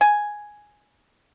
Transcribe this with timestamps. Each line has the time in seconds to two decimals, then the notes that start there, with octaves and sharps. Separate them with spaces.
0.01 G#5